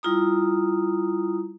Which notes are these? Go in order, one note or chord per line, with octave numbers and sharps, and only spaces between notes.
G3 E4 F4 A#5 D#6